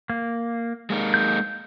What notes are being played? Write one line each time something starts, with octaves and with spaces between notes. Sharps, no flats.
A#3
G#3 A#3 D#4
G6